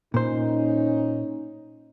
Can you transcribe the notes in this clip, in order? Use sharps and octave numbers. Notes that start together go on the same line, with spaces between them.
A#2 C#4 D#4 C5